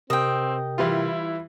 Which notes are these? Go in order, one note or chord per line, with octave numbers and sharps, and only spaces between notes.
C3 C4 G4 A#4 D#5 G5
E3 G3 E4 F4